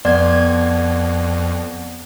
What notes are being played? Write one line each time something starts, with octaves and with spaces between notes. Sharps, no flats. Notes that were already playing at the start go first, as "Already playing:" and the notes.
F2 B3 D5 G#6